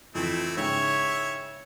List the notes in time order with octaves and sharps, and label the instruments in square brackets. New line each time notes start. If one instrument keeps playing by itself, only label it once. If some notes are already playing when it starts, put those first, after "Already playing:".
[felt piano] F2 E3 [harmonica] A3 C4 E4
[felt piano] G#2 C#3 G5 [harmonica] E4 E5 [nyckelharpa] C#5